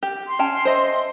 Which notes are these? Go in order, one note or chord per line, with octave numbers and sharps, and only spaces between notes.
G4
C6
C#4 G5 A5
C5 D#5 E5